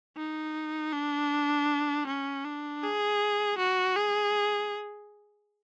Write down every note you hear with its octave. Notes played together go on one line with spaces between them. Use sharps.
D#4
D4
C#4
D4
G#4
F#4
G#4